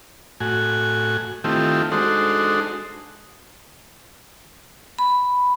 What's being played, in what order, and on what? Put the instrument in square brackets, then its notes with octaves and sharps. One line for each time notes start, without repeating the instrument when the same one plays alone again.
[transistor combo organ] A2 F#4 G#5
D#3 A3 C4 E4 F4 G4
G#3 D4 D#4 F#4 A4 C5
[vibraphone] B5